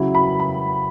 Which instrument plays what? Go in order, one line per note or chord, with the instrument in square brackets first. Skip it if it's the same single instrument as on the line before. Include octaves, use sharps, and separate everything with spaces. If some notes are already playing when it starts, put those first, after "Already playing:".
Already playing: [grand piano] C#3 F#3 E4
B5
B5